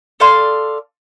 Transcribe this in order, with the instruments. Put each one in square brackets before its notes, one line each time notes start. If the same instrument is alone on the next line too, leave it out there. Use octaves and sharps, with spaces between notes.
[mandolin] A4 D5 F5 C6